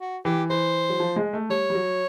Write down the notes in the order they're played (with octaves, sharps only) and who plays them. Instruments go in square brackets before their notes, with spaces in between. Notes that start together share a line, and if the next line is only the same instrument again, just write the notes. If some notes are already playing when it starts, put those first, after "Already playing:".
[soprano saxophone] F#4
[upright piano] E3 [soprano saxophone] G4
[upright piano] E3 [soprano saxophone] C5
[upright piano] F#3
F3
G#3
A3
[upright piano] G3 [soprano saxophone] C#5
[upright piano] G3
F#3